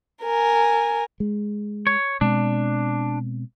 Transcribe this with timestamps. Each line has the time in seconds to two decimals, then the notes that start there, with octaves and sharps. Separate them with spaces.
0.23 A#4 G#5
1.20 G#3
1.87 C#5
2.21 B2 G#3 C4 D4